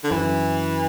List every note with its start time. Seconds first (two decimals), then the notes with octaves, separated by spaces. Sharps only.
0.04 D3
0.11 F#2 E3